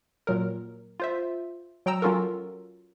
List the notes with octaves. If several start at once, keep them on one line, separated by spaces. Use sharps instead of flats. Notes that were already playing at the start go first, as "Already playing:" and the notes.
A#2 F#3 A#4
F4 C5 E5
F#3 G5 A#5 E6
F#3 C#4 F4 F#4 A4 A#4